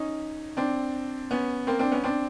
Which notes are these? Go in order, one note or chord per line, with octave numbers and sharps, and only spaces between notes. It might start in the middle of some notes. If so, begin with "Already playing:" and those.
Already playing: C#4 D#4
C4 D4
B3 C#4
A#3 C4
C4 D4
B3 C#4
C4 D4